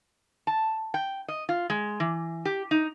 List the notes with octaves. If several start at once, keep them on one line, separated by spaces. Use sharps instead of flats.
A5
G5
D#5
F4
G#3
E3
G4
D#4